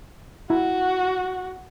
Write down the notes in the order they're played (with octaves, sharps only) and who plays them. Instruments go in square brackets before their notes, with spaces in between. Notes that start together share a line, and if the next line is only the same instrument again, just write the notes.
[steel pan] E4 [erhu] F#4